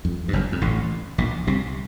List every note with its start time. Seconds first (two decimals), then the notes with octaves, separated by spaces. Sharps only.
0.05 F2
0.28 G2
0.33 F#1 F#2
0.52 F2
0.61 A1 A2
1.18 A#1 A#2
1.47 C2 C3